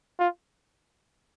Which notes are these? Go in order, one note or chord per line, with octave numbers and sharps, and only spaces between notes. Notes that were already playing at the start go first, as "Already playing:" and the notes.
F4